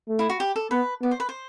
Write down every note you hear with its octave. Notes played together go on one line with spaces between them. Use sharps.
A3
E4
F#4
G4
A4
B3 B4
B3 D5
C5
B4
C5